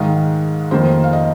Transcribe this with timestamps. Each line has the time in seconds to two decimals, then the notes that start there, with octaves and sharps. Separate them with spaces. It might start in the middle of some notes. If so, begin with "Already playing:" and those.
Already playing: G#2 D#3 G#3 F5
0.71 F2 D#3 A#3 C5
1.04 F5
1.13 D#5